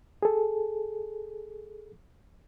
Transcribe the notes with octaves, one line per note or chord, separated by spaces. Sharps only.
G#4 A4